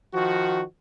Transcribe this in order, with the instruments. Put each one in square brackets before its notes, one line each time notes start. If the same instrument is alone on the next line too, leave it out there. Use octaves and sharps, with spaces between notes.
[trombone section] D#3 F3 F#4